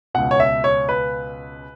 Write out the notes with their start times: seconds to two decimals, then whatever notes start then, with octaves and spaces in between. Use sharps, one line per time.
0.14 C#2 B2 F#5
0.31 C#5
0.40 E5
0.64 C#5
0.89 B4